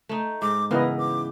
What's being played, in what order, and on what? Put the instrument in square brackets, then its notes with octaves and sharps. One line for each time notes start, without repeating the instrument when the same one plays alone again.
[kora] A3 D#4
[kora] G#2 [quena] D6
[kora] C#3 E3 [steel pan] B3 E4 D#5 [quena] A#4
[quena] D6